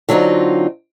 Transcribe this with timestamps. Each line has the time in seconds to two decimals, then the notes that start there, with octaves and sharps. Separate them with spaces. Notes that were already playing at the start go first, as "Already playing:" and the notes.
0.09 D3 F#3 C4 D#4 F4